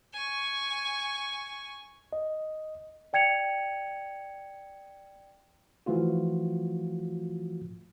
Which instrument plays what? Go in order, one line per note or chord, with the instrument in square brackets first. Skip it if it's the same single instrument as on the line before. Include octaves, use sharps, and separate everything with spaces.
[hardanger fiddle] G#5 C#6
[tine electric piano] D#5
[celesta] D5 G5 G#6 C#7 F7
[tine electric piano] E3 F3 A3 F4 F#4